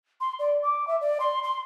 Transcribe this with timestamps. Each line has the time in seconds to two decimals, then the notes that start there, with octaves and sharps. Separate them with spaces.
0.20 C6
0.39 D5
0.62 D6
0.87 E5
1.01 D5
1.20 C6
1.43 C6